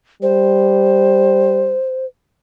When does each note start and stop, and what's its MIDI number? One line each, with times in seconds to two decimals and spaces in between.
0.22 1.76 55
0.22 2.06 72